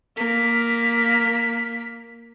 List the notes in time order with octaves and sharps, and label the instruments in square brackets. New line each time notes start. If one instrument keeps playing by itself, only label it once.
[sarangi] A#3 [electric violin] B6